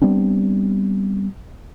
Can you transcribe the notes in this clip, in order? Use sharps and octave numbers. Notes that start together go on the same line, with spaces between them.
G3 B3 C4 D4